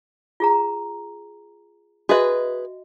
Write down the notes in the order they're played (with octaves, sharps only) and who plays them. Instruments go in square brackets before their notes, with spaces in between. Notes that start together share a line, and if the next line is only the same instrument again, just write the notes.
[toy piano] F4 G#4 A#5
[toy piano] F#4 D#5 E5 [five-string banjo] G#4 B4